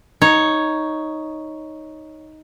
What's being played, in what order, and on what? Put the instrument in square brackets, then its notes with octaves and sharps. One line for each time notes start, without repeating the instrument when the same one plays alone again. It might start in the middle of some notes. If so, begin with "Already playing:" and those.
[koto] D#4 C#5